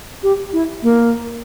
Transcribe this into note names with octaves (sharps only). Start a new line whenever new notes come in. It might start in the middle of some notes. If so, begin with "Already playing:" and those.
G4
E4
A#3